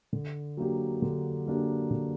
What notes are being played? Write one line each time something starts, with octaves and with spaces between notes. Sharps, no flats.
D3
F#3 A#3 D4 G4
D3
F#3 A#3 D4 G4
D3